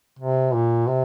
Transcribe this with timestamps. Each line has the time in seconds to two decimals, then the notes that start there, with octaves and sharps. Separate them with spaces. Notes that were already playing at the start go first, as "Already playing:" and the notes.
0.19 C3
0.54 A#2
0.89 C3